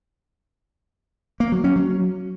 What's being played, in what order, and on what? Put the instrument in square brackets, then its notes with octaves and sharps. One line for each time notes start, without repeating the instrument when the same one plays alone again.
[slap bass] A#3
F#3
C#4
F#3